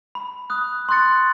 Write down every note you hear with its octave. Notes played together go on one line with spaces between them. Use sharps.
B5
D#6 F#6
C6 C#6 F#6 A6 C#7